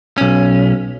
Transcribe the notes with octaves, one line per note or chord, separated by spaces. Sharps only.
B1 C#4